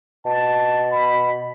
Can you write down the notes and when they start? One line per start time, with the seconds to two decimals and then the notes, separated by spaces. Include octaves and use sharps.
0.25 B2 A5
0.91 B5